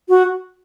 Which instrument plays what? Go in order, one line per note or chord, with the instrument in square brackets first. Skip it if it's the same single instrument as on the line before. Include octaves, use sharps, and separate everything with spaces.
[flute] F#4